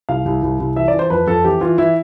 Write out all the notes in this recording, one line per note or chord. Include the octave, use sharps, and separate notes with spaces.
C2 F5
C2
C2
C2
E3 E5
D5
E3
C5
F2 B4
F2 A4
E3 G4
E3 F4
E3 E4